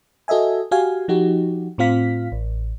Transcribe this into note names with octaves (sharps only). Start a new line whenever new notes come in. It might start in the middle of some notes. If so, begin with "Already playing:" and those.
F#4 A4 D#5 E5 G#5
F#4 G4 F5 G#5
F3 D#4 F#4 G4
A2 C4 F4 F5 B6
A1